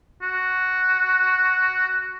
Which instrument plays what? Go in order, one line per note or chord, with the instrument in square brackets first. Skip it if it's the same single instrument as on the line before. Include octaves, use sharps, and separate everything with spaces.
[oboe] F#4